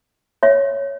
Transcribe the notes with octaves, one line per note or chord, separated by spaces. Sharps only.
C#5 E5